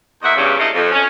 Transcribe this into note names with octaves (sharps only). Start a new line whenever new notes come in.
E2 A#3 D#5 E5 F#5
E2 G2 C#3
G2 A3 A#3 E4 A4 D#5
F2
C#4